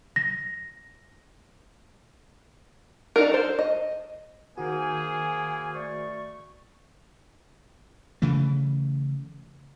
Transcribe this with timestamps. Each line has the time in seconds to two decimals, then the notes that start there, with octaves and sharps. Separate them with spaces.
0.16 A#6
3.16 D4 D#4 A#4
3.32 A4 C5
3.59 D#5
4.58 D#3 A#3 F#4 G#4 C5 G#5
5.75 A3 D5 C#6
8.22 C#3 E3 A3